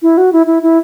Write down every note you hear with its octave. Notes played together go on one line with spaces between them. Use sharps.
E4
F#4
E4
E4
E4